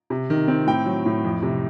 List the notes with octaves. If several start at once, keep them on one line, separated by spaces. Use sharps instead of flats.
C3
D#3
C4
A2 G5
F#3
A2
F2
C3